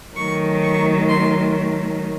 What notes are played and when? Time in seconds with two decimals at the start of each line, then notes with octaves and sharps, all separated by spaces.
0.16 D#3 F#3 A3 C#6
0.62 C#6
1.08 C6